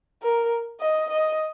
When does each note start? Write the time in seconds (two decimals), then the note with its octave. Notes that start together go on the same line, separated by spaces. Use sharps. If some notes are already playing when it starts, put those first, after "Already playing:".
0.23 A#4
0.81 D#5
1.10 D#5